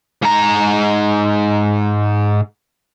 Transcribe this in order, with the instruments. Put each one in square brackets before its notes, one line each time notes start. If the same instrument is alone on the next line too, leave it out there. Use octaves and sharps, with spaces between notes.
[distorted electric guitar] G#2 A#5